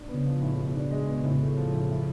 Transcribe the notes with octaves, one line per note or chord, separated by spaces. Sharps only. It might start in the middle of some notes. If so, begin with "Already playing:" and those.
Already playing: D4
B3
C#3
F3
A2
B2
D4
G#3
B2
A2 C#3
A3
F3
A2
A2